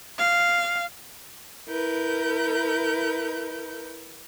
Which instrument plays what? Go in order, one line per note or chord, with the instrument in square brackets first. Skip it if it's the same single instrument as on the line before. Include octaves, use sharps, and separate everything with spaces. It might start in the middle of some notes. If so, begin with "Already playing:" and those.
[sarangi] F5
[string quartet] E4 A#4 B4 G6